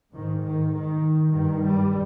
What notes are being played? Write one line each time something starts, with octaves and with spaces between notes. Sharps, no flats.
G#2 D#3
D#3
D#3
G2 D#3
G3